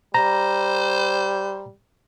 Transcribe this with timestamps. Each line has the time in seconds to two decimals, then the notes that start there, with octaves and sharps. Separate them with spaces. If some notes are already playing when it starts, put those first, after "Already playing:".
0.14 G3 C5 A#5